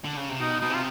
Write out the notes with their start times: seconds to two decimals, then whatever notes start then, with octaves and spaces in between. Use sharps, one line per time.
0.04 D3
0.17 C#3
0.29 C3
0.40 B2 D#4
0.60 B2 D#4
0.70 C3 F4